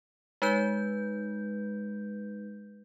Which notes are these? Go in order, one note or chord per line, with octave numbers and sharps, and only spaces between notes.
G#3 D#4 B4 G6